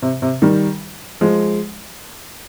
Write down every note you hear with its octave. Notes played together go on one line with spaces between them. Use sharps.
C3
C3
D#3 G3
F3 G#3